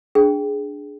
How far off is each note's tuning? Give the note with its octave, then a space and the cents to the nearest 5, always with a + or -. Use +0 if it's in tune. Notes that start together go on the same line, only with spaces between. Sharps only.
D4 +0 G#4 +0 G5 +0